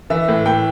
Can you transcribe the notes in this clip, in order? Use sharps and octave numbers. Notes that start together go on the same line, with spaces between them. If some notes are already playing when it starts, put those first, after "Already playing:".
E3 E5
A2
A2 G5